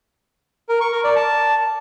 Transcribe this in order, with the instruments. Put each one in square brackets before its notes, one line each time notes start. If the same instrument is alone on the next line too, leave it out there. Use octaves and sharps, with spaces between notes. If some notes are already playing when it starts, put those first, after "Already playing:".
[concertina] A#4
C#6
A#4
D5
A5